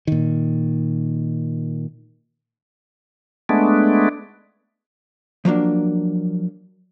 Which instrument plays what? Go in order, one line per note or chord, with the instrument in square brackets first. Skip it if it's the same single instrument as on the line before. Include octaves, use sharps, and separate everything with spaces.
[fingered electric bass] A#2 D#3
[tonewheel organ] G#3 A3 B3 D4
[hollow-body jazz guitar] F3 F#3 A#3 D4